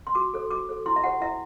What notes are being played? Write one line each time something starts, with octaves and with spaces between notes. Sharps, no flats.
C6
F#4 D6
A4 C5
F#4 D6
A4 C5
E4 C6
E5
G4 C5 F#5
E4 E5